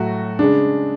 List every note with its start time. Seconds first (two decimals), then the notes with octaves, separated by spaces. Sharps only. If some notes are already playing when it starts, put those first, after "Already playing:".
Already playing: A2 F#3 A3 F#4
0.39 C#3 G#3 D4